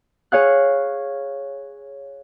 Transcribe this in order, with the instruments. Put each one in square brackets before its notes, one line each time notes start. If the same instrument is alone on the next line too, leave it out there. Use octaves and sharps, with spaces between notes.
[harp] G#4 C#5 F5 F#6